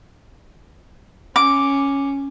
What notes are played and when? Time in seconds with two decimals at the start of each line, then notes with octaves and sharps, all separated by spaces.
1.36 C#4 D6